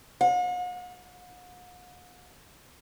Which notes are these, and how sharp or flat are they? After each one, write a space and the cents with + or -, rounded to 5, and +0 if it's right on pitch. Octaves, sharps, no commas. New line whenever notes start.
F#5 -45